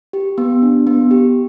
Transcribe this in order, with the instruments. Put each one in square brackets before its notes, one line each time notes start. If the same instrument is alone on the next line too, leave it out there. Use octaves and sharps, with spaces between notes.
[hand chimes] G4
B3
D4
B3
G4